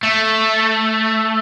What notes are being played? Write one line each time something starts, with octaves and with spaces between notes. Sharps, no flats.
A3